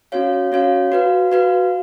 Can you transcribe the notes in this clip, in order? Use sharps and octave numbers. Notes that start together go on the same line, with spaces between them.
C#4 F#4 C#5 F5
C#4 F#4 C#5 F5
F#4 B4 F5
F#4 B4 F5